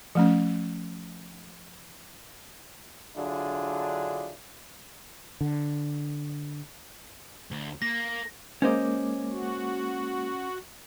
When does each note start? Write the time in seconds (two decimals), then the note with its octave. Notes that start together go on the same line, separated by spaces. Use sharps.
0.15 F3 A3 C#4
3.16 D3 F#3 D4 E4 F4 G#4
5.41 D3
7.51 D2
7.82 A#3 A#6
8.62 G#3 A#3 C#4 C5 D#5 D6
9.30 F#4